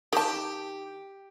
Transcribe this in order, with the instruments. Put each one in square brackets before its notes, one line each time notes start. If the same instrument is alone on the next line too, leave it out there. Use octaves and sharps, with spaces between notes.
[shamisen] D#3 A5 [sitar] G4